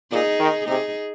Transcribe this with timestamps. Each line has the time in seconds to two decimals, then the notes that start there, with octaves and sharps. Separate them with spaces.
0.12 A#2 D#4 G#4
0.40 D#3
0.68 C3 D#4 G#4